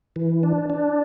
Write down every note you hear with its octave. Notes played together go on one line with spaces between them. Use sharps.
E3
D4
D4